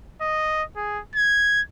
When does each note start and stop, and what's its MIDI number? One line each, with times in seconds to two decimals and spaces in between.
0.21 0.63 75
0.76 1.00 68
1.15 1.61 92